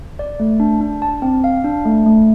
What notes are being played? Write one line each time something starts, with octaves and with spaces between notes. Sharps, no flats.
D5
A3
D4
D4
A5
C4
F5
D4
A3
A3